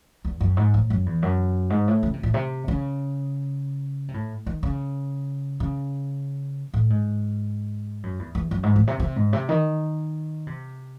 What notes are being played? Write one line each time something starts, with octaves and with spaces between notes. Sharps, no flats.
E2
F#2
G#2
A2
F#2
E2
F#2
G#2
A2
C#3
C3
A2
C3
C#3
C3
A2
D#3
C#3
C#3
A2
G#2
F#2
E2
E2
F#2
G#2
A2
C3
C3
G#2
C3
D#3
C3